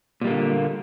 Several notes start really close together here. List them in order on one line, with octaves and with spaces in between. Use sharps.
A#2 G3 A#3 D3